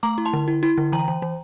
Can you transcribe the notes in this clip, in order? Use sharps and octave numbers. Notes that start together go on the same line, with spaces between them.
A3 A#5 D6
E4
A5 C6
D3
E4
E4
D3
E3 G5 A#5
E3
E3